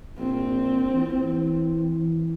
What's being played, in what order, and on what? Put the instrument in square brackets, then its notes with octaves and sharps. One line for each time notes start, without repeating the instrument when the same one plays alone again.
[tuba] A#1 [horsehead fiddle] C4
[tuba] E3